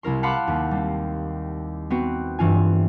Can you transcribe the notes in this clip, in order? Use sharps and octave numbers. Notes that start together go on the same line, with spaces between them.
C2 E4 A#4 C6
F5 F#5 A5 B5 C6 D6
D#2 B6
G3 C4
B3 C4 F#4
G2 E3 F4 G#5